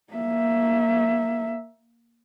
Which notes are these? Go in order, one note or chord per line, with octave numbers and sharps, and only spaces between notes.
A#3 E5